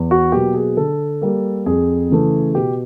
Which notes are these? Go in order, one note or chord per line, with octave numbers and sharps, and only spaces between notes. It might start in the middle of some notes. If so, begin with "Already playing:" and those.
Already playing: E2
F#4
B2 F#3 A#3 G4
G#4
D3 A4
G3 A#3
F2 G#4
C#3 E3 A3
B2 G4